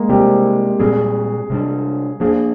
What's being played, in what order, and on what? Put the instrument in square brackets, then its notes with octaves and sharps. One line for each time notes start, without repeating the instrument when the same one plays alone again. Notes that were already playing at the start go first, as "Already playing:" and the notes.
Already playing: [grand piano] G#3 A#3
[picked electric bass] C3 G3 C4 [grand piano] G4
[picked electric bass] A#2 G3 C4 [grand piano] G#4
[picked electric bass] C3 G3 D4
[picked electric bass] F3 A#3 D4 [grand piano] G#4